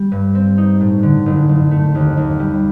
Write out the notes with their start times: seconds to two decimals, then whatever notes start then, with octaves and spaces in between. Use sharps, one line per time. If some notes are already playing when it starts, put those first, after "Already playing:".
Already playing: G3
0.12 G2
0.35 C4
0.58 D#4
0.81 A2
1.03 D3
1.26 F#1
1.49 F#1
1.71 A3
1.95 D#2
2.17 D#2
2.39 G3